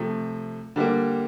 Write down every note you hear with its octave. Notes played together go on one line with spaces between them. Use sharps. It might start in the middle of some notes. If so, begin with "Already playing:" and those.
Already playing: C3 F3 A3
D3 G3 A#3